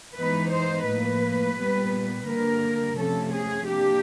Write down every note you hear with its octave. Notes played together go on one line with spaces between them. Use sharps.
E3 G#3 B3 D#4 B4
C5
A2 F3 A#3 B4
A#2 G3 B3
D3 G3 A#3 A#4
C3 F3 A3 C#4 A4
G#4
A#3 D4 G4